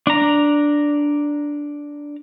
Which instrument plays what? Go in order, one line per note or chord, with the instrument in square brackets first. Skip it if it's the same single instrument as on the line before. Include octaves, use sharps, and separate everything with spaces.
[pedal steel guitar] D4 A#5